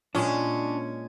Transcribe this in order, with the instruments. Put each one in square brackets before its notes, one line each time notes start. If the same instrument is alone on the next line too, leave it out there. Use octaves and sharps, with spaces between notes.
[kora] A#2 G#3 [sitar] C#4 [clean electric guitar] D4